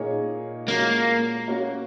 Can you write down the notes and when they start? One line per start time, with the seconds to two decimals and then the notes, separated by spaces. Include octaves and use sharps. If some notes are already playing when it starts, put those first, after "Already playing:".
Already playing: A#2 A#3 D#4 G#4 C#5
0.68 A#2 G#3 A#3 C#4 F#4 C#5
1.48 A#3 C#4 F#4 A#4 C#5